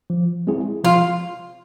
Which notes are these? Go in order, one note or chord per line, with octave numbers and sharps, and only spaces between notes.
F3
G#3 C4 E4 G#4
F3 F4